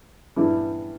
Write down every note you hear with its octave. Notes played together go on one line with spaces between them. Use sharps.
G2 E3 G3 B3 E4